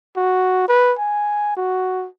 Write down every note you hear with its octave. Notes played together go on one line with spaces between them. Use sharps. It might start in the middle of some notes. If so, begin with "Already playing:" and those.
F#4
B4
G#5
F#4